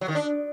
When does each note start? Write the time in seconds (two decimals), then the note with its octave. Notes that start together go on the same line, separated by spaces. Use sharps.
0.01 F#3
0.08 D#3
0.15 D4